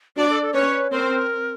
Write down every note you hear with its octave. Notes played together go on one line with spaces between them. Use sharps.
D4 F#4 D5
A4
A4
C#4 B4 C#5
C4 A#4 C5